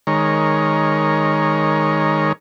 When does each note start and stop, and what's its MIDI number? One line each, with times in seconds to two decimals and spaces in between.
0.07 2.32 51
0.07 2.32 56
0.07 2.32 70
0.07 2.32 73